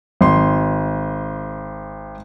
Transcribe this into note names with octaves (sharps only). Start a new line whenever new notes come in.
G#1 C6